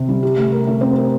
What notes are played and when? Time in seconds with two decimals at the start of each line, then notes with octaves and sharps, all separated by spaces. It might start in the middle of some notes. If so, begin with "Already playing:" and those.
Already playing: C3
0.08 G3
0.23 G4
0.37 A3
0.52 A#4
0.67 A3
0.81 C4
0.96 A#4